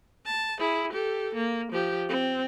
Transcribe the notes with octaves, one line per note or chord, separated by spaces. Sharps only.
A5
E4 G#4
G4 A4
A#3
F3 G4
C4